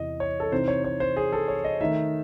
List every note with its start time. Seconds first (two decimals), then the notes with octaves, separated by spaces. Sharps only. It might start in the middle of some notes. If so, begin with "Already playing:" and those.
Already playing: E2 C3 E3 D#5
0.20 C#5
0.40 A4
0.52 C3 E3 C4 D#4 C5
0.68 C#5
0.84 C#5
1.00 C5
1.17 G#4
1.33 A4
1.48 C#5
1.64 D#5
1.81 D#3 A3 D#4 E5